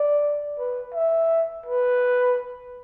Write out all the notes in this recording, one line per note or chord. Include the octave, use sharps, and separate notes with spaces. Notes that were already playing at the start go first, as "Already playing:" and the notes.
Already playing: D5
B4
E5
B4